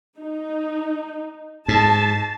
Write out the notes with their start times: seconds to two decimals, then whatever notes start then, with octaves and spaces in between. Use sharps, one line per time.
0.19 D#4
1.68 G#2 A5